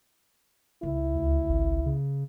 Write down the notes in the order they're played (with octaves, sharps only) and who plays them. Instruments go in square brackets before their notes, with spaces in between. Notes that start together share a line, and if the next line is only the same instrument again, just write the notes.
[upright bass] C#2 [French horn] E4
[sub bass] D2
G#1
C#3